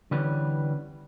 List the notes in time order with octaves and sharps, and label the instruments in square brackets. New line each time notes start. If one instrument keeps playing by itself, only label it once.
[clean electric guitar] D3 E3 G3 B3 C#4